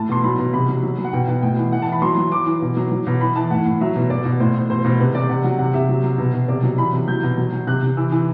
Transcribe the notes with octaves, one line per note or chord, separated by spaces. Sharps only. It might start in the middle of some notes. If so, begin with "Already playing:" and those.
Already playing: A2 A5
B2 C6
F#3 B5
B2
C3 B5
F#3
F#3
F#3
F#5
B2 G5
B2 F#5
A2 G5
E3
E3 F#5
E3 A5
B5
F#3 C6
F#3
E3 D6
E3
B2
F#3
F#3
B2
E3 B5
E3 A5
A2 F#5
A2
F#3 E5
B2
B2 D5
B2
A2 C5
A2
B2 C5
B2 B4
C3 B4
C3 D5
C3 F#5
F#3 F#5
C3 F#5
C3 E5
F#3
F#3
B2
B2
C3 D5
F#3
E3 B5
C3
F#3 G6
B2
F#3
F#3
C3 F#6
C3
E3 E6
E3